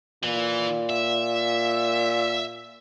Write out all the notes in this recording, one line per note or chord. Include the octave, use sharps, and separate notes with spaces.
A#2 E3
E5